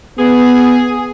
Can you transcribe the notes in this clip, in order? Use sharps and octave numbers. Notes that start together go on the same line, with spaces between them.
B3 G#4